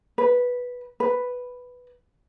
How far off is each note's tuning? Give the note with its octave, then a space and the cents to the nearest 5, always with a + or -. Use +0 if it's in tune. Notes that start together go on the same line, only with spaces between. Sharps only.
B4 -5
B4 +0